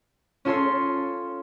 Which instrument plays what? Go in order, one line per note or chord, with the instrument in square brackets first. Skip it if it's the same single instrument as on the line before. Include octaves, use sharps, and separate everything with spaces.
[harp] C#4 F4 A4 C#5 C6